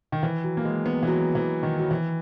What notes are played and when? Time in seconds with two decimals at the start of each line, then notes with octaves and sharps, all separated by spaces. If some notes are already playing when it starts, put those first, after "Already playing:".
0.12 D#3
0.23 E3
0.44 F#3
0.57 A#3
0.65 G#3
0.86 B3
1.03 E3
1.07 F#3
1.35 E3
1.63 D#3
1.79 F#3
1.91 E3